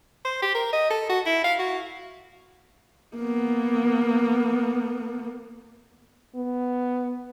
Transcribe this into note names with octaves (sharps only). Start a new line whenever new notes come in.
C5
G4
A#4
D#5
A4
F#4
E4
F5
F#4
A#3 B3
B3